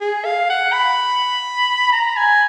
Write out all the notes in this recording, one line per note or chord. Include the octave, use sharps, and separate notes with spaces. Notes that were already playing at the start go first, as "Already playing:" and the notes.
G#4
F5
F#5
B5
A#5
G#5